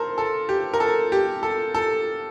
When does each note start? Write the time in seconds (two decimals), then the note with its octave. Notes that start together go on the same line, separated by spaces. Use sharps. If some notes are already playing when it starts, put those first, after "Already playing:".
Already playing: A4 A#4 C5
0.18 A4
0.49 G4
0.74 A#4
0.80 A4
1.12 G4
1.43 A4
1.74 A4